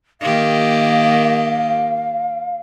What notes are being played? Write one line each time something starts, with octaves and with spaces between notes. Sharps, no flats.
D#3 A#3 G4 F5